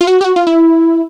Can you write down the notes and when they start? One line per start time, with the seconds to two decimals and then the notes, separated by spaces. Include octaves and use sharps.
0.01 F4
0.07 F#4
0.21 G4
0.24 F#4
0.36 F4
0.47 E4